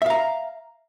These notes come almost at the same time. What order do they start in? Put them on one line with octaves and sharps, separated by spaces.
E5 F5 A#5